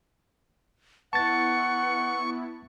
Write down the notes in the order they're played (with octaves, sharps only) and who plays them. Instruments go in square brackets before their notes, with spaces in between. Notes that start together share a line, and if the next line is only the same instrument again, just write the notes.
[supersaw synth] B3 E4 [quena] F#5 [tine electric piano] A5 A6 [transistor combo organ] C#6